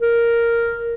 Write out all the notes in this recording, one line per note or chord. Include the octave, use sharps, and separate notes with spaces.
A#4